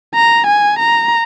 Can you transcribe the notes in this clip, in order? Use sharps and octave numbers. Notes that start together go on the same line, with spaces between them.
A#5
G#5
A#5